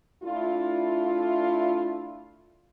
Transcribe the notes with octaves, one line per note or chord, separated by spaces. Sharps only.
A3 D4 E4 F4